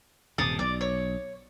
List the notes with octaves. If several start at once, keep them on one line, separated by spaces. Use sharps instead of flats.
D#1 G2 C3 A5 D#6
B1 D5
C#5